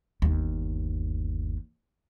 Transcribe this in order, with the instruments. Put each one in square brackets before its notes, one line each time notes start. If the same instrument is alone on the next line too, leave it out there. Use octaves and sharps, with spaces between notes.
[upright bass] G1 D#2